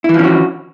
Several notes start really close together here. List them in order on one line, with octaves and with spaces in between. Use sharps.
E4 E3 F3 C#4 F#4